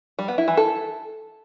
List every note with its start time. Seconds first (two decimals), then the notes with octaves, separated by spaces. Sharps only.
0.19 G3
0.28 B3
0.38 E4
0.48 E3
0.57 A4